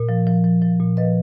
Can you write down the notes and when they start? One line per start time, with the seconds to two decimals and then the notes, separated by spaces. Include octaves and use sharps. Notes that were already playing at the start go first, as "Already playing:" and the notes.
Already playing: A#2
0.09 F3
0.27 F3
0.44 F3
0.62 F3
0.80 A#2
0.97 F3 B4 D#5